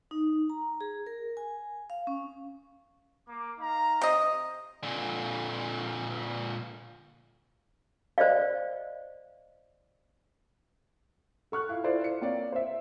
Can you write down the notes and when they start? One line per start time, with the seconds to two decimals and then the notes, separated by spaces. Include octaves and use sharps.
0.11 D#4
0.50 A#5
0.81 G#4
1.06 A#4
1.37 G#5
1.90 F5
2.07 C#4
3.29 A#3 D6
3.59 D#4 F5 A#5
4.01 C3 D#5
4.83 A#2 D3
8.18 C5 D5 D#5 F5
11.52 A4 C#6 F6 F#6
11.69 E4 F4 F5
11.84 E4 F4 A4 C5 D5
12.04 C#7
12.21 A#3 C4 C#5 D5 F5
12.52 C5 E5